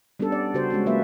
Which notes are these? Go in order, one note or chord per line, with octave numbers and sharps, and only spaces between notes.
G3 B3 C#4 D4 A4
D5
C#3 F#4 G4 C5
G#3 C#4 F#4
F#3 G#3 A#3 F4 B4 E5